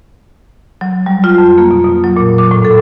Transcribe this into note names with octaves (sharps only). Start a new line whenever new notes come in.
F#3
G3
F4
F2
A#3
B2
B2
F#3
A#2
D6
A2
A4